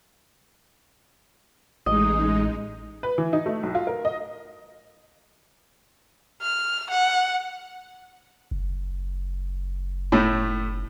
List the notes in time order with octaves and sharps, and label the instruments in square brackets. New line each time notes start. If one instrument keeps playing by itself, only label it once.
[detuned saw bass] A1 [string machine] G#3 D#4 [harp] D#5
[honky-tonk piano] B4
E3
D#4
A3
B1
F4
A#4
D#5
[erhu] F6
F#5
[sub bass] F#1
[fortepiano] A2 A3